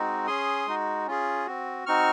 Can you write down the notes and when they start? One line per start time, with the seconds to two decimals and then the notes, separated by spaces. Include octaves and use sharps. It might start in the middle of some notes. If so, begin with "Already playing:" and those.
Already playing: G#3 C4 D#4 F#4
0.27 C#4 G#4 C6 D#6
0.67 G#3 D#4 F#4
1.07 C#4 F4 G#4
1.46 C4 F#4
1.86 C4 D#4 F#4 C#6 F6